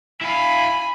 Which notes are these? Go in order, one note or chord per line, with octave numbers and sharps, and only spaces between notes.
E4 F5 G#5 B5